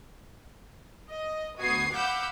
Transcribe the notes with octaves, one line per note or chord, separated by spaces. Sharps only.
D#5
D2 B3 F#4 D#6 G#6 C7
F5 F#5 B5 D6 E6 G6